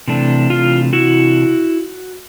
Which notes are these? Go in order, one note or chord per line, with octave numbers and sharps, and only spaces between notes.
C3 E3 A3 D4
F4
E4 F#4